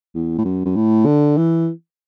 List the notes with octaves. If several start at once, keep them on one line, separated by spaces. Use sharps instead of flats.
E2
A2
F#2
F#2
A2
D3
E3